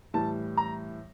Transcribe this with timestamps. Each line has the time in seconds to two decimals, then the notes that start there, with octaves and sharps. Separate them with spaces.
0.14 A2 E3 G3 A5
0.57 A#5